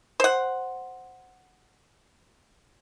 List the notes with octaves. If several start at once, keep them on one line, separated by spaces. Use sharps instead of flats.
C5 F#5